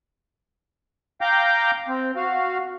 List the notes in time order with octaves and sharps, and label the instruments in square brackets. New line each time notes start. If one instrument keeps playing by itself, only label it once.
[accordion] F5 G5 A#5 D6 G6
C4
F#4 F5